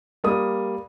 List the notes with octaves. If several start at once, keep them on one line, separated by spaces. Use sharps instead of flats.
G3 A#3 D#6